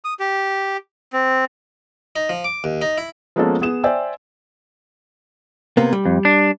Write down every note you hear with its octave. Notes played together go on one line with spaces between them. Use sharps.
D#6
G4
C4
D#4
F3
D6
D#2
D#4
E4
F3 G#3 A#3 B3 C#4 A4
B3 G#4 D#6 E7
C5 D5 E5 G5 G#5 E6
C3 A#3 B3
G3
F2
D4